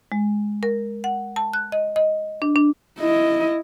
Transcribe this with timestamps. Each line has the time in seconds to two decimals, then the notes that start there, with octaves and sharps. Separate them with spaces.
0.12 G#3
0.63 A#4
1.04 F#5
1.36 A5
1.53 F#6
1.72 D#5
1.96 D#5
2.42 D4
2.56 D4
2.99 E4 D#5